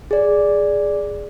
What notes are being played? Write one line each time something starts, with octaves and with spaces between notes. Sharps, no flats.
G#4 D5